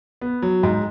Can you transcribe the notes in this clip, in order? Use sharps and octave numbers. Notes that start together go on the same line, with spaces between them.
B3
F#3
G#2